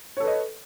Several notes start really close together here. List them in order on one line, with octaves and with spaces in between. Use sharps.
C#5 A4 B4 D#5